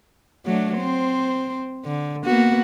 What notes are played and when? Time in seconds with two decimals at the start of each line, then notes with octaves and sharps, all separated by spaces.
0.45 F#3 A3 D4
0.78 C4 C5
1.85 D3
2.25 A#3 B3 F#4